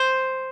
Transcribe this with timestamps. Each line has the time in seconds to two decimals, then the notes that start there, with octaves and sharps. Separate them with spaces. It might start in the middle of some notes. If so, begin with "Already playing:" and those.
Already playing: C5